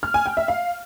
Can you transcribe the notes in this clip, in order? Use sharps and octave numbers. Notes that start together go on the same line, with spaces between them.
F6
G#5
G5
E5
F5